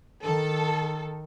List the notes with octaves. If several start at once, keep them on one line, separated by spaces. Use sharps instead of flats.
D#3 A4